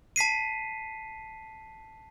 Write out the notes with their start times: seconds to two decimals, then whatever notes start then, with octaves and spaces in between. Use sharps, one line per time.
0.16 A5 B6 C7 D#7